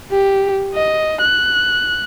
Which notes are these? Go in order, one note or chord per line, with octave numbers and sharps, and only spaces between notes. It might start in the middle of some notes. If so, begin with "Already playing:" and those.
G4
D#5
F#6